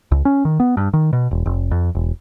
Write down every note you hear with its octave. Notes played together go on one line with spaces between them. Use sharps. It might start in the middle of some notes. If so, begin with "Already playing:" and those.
C#2
C#4
D#3
B3
G2
D#3
B2
E1
F1
F2
E1